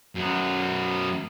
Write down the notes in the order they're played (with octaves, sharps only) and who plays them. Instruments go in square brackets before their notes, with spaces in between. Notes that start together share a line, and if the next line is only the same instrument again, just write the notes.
[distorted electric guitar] F#2 B3